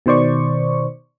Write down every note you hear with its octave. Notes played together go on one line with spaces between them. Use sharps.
B2 D#3 C5 D5 C#6